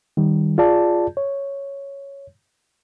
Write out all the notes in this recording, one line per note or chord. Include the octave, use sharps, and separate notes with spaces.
D#3 G3
F4 G#4 D5 A5
C#5